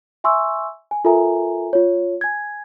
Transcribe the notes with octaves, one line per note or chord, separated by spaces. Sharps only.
E5 G#5 C6 C#6 E6
G#5
F4 A4 A#4 E5 G#5 A#5
F4 C#5
G#5 G#6